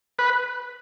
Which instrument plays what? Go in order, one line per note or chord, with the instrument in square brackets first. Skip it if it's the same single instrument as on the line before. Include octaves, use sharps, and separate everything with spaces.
[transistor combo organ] B4